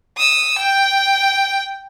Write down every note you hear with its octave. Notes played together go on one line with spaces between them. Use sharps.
D#6 E6
G5